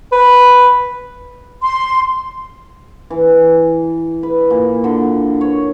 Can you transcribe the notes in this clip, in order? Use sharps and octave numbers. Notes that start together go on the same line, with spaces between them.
B4
C6
E3
B4
A#2
D3
C#5